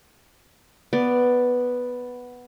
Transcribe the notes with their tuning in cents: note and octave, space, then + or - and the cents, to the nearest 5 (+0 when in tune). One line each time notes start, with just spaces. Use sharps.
B3 +0 D5 +0